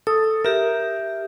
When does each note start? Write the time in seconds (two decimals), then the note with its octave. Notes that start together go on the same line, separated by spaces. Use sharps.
0.07 A4 D#6
0.45 G4 A#4 E5